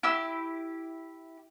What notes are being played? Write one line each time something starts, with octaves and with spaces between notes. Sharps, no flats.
E4 G4 E6